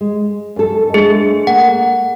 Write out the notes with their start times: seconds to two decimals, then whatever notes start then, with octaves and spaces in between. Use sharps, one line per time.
0.01 G#3
0.56 F#2 A4
0.94 G#3 A3 D4 G#4
1.47 A#3 F#5